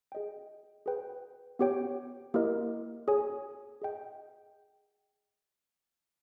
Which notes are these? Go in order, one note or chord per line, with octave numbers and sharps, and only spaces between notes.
G#4 D#5 G5
G#4 B4 G5
B3 G4 C#5 G5
A#3 E4 G4 A#4 D#5
G#4 C#5 G#5
G#4 D#5 G5